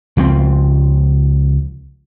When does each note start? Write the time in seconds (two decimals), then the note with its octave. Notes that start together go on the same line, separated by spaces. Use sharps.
0.17 C#2 F3 G#3 C4